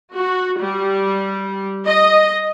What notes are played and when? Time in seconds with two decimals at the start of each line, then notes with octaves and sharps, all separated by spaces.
0.12 F#4
0.58 G3
1.86 D#5